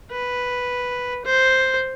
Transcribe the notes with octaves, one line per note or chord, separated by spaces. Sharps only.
B4
C5